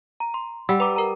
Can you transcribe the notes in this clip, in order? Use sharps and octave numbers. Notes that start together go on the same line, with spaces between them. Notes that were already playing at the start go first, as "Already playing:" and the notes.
A#5
C6
G3 F#5 B5 E6
B4 A#5 D6
A#4 A#5